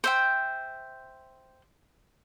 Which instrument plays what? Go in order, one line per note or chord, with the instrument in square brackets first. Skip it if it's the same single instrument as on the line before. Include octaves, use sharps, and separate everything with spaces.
[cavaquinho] C5 E5 G5